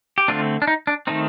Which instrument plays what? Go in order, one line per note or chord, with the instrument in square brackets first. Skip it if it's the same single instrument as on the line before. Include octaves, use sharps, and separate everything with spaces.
[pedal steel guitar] G4
D3 A3 C4 D4 F4
D4
D#4
D4
D#3 A3 C4 D#4